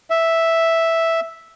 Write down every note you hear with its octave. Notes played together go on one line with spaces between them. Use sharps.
E5